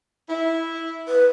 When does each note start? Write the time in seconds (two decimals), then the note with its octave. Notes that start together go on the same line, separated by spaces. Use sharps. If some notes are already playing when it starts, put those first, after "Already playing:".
0.29 E4
1.08 B4